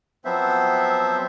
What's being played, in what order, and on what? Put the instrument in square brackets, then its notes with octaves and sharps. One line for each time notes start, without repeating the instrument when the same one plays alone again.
[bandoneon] F3 F#3 B3 C4 C5 E5